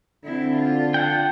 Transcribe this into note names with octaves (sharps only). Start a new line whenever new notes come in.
D3 C4 E4
F4
D4 F#5 G5